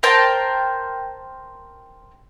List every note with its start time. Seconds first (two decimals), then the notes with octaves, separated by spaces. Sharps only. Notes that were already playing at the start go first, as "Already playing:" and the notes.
0.03 A#4 C5 G5 A5